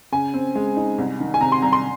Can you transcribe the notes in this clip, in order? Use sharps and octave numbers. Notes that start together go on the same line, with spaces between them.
C#3 G#5
C4
G#3
D#4
C2
D#3
G#5
C3 A#5
C6
C2 A#5
C6